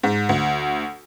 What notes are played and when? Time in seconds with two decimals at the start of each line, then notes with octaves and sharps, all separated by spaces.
0.03 G#2
0.29 D2